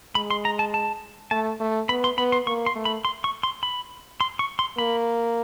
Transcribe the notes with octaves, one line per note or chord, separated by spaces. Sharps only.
G#3 B5
C6
A#5
A5
A5
A3 A5
A3
B3 B5
C6
B3 B5
C6
A#3 C#6
C6
A3
B5
C6
C#6
C6
B5
C6
C#6
C6
A#3 B5